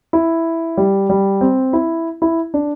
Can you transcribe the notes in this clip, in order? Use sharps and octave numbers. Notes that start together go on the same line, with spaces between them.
E4
G3
G3
C4
E4
E4
D4